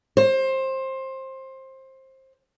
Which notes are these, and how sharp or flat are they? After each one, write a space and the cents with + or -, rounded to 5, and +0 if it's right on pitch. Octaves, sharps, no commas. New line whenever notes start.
C5 +20